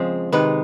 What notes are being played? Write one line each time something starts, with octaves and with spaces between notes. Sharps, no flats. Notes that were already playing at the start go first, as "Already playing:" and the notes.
Already playing: C#3 F3 G#3 C4
C3 D#3 G#3 B4